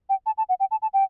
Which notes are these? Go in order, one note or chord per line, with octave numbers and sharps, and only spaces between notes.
G5
A5
A5
F#5
G5
A5
A5
G5